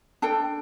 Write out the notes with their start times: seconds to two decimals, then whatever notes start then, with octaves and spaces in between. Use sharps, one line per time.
0.22 D4 A4 G5